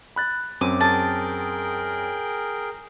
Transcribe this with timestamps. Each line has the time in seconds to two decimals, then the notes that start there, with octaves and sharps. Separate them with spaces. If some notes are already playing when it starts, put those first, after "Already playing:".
0.16 B5 F#6 A6
0.61 F#2 C4 D6 D#7
0.80 G#4 A#4 G5 A5